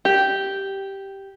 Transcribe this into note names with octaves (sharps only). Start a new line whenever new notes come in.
G4